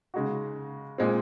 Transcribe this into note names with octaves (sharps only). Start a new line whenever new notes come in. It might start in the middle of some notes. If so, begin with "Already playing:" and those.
C#3 G#3 D#4 F#4
A#2 G#3 C4